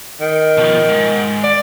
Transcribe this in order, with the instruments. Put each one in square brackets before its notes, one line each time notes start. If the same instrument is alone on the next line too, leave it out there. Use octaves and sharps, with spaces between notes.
[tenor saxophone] D#3
[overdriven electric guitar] B2 F3
G#2
[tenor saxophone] D5